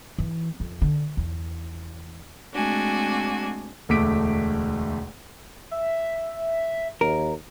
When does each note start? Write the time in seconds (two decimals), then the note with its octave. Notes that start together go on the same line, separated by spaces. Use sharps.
0.18 E3
0.60 F2
0.82 D3
1.17 E2
2.54 G#3 A3 C4 D4 F#4 G#5
3.89 E1 D2 A3 D6 B6 D7
5.71 E5
7.01 D#2 A#4